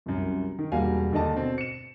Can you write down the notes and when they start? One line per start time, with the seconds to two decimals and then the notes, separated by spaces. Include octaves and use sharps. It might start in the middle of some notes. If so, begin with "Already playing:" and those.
0.06 C2 F#2
0.59 D#3
0.72 E1 G3 A#3 F#4 F5 G#5
1.12 D#2 D3 D5 D#5 A5
1.37 B2 C4
1.58 C#7 E7